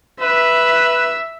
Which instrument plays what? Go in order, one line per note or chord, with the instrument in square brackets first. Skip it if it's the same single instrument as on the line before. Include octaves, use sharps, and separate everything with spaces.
[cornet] B4 [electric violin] E5